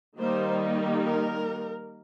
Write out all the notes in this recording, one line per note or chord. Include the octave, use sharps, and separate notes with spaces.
D#3 G3 A#3 D#4 C5
A#4